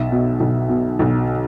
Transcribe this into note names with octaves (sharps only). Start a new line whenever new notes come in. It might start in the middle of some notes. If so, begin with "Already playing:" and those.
Already playing: B1 E5
B2
B1
B2
B1